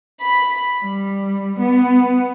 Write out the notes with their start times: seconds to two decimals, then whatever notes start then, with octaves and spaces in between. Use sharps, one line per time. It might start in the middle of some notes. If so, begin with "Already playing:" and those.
0.21 B5
0.83 G3
1.60 B3